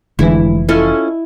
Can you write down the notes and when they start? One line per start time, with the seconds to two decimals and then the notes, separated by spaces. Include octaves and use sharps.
0.19 F1 D3 E3 G#3 E4
0.69 C#4 E4 F4 A4 D#5